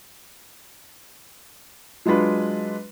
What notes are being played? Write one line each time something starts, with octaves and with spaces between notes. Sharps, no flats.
F#3 G#3 D4 F4 B4